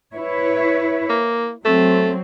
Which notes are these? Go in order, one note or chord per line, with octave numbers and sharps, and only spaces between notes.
E4 B4 C#5
A#3
F#3 A3 C4